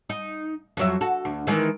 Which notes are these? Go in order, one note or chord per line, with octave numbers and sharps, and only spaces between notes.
D#4
F2 F#3 E5
F#4 A4
D2
D#3 E3 G#3